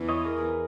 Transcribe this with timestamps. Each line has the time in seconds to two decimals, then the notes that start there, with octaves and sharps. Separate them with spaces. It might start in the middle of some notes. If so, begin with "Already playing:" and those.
Already playing: E2 E3
0.09 C#5 D#5
0.25 G#4 A#4